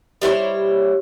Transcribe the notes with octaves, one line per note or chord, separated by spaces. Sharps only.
G3 E4 C5 C#5